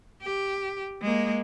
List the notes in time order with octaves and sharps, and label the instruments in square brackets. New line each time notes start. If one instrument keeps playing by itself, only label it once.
[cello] G4
G#3 A#3